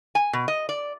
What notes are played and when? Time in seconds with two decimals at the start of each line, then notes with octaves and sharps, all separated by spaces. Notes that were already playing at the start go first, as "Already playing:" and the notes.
0.15 G#5
0.33 B2
0.48 D#5
0.69 D5